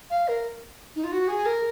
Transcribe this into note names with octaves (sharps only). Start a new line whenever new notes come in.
F5
A#4
D#4
F4
F#4
G#4
A#4